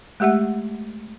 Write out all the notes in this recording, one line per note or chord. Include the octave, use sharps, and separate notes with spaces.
G#3 A3 G4 E5 F#5